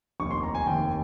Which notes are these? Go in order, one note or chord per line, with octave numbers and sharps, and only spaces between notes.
F1 D#2 D#3 C#6
C6
A#5
G#5
F1 D#2 D#3 G5